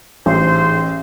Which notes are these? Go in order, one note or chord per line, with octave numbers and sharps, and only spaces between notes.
A1 G#2 C5